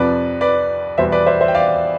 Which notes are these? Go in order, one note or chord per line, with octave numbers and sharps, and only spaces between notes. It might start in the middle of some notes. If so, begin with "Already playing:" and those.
Already playing: F2 C3 F3 B4 D5
B4 D5
E2 B2 G3 C5 E5
B4 D5
C5 E5
C5 E5
G5
D5 F5